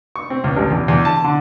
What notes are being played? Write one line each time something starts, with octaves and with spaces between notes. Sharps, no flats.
C#6
C4
C#2
A1
E2
E2
A5
D3